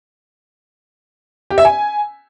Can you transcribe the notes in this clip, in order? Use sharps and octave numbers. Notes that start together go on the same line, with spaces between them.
G4
E5
G#5